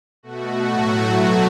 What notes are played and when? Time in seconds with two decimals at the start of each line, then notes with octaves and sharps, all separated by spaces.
0.23 B2 A3 F#4
0.68 A2 F#3 A3 F#4
1.13 B2 F#3 A3 F#4